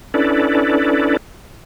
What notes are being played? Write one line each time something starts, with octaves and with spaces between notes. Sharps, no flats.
C#4 D4 E4 A4 B4 D5